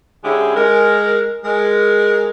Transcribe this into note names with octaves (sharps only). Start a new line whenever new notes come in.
D3 G#3 C#4 E4 G4 G#4
G#3 A#4
G#3 A#4